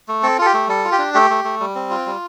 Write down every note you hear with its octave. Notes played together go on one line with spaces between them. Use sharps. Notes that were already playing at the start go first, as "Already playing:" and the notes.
A3
C4 A4
F4 A4
G4
A3
G3 A4
F4
G4
D4
A3 G4
A3
A3
G3
C4
F4
G3